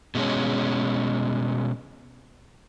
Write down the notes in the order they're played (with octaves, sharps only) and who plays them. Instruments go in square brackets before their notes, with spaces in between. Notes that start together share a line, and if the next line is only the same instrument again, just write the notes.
[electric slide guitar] B2 G#3 C#4